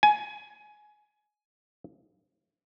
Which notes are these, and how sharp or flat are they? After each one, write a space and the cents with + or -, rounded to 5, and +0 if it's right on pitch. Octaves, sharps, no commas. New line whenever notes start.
G#5 +15